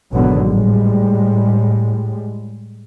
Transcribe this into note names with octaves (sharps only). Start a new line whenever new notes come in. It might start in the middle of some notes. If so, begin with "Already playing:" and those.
G#1 E2 B2 D3 F#3 B3
A2 G3 G#3